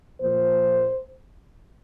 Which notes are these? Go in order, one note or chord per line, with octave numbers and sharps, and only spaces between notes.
A#2 F3 A#3 C5